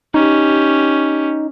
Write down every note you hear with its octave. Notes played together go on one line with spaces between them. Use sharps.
C#4 D#4 G4